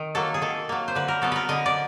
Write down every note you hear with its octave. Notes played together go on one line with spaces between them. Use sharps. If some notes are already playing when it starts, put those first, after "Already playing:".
Already playing: D#3
F#3 A#3 A4
G#4
D#3 A4
F#3 A#3
C5
D3 B4
A#4
F#3 B3 A4
A#4 B4
D3 D#5
D5